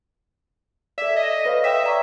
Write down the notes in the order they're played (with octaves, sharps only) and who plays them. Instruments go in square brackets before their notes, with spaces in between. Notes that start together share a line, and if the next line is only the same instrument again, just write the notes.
[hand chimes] A4 D5 [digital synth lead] E5
[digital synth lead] D#5
[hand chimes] B4 C#5 F5
[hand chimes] B4 G5 D#6 [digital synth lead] E5
[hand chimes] D5 A#5 C#6